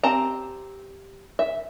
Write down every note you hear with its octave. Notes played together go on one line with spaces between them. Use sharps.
C4 G4 A5 A#5
E5